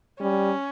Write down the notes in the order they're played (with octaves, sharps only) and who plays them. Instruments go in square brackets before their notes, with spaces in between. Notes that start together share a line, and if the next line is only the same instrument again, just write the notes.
[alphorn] G3 [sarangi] C#4